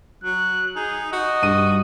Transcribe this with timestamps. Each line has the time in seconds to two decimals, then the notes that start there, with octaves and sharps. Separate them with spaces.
0.24 F#3 F#6
0.76 D#4 G#4
1.12 F#4 D#5
1.42 G2 D#7